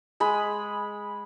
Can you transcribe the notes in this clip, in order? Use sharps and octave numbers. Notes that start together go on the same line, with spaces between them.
G#3 G#4 B5